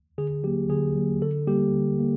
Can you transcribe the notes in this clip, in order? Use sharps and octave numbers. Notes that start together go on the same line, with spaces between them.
D3 G#4
F#3 A#3 G4
D3 G#4
F#3 A#3
D3 A4
G3 A#3 G4
D3
A#3